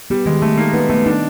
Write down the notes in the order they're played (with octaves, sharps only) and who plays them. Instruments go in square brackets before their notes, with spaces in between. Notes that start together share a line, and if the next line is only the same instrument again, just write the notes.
[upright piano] G3 [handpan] B3
[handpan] D#3 [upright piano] G#3
[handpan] G3 [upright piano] A3
[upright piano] A#3 [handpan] D#4
[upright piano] B3 [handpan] D#4
[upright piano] A3 [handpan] B3
[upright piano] D4 [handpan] D#4